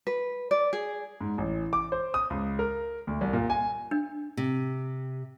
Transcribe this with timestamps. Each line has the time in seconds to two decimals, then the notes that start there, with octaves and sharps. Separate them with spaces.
0.07 B4
0.51 D5
0.73 G#4
1.21 G#2
1.38 A1
1.73 D6
1.92 C5
2.14 D#6
2.30 C#2
2.59 A#4
3.07 D2
3.21 C2
3.33 A#2
3.50 G#5
3.91 D4
4.37 C3